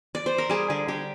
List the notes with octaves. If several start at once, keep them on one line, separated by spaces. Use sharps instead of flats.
D5
C5
A#4
G3 G#4
D3 G#4
D3 G4